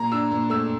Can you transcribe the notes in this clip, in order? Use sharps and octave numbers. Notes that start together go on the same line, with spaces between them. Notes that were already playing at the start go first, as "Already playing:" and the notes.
Already playing: A#2 A#5
D4 E6
A#2
A3 E6